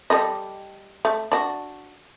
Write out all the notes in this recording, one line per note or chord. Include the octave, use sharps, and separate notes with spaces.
G3 A4 D#5
A3
D4 F#4